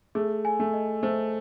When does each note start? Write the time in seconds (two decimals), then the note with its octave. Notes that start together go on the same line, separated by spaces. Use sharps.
0.15 A3 G#4
0.45 G#5
0.60 A3
0.73 D#5
1.03 A3 C5